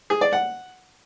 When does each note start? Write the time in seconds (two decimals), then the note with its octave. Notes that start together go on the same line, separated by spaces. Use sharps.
0.10 G#4
0.21 D5
0.33 F#5